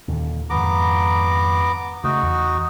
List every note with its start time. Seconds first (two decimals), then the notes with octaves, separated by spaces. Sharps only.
0.08 D#2 A#2 D3
0.50 F2 G#2 D#3 B3 A#5 D6
2.04 C#3 A3 D#4 F#4
2.23 E2